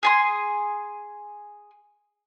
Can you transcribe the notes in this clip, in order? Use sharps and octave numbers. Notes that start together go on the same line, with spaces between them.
G#4 G#5 C6